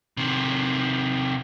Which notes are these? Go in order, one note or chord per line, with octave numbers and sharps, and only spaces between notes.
C3 D#3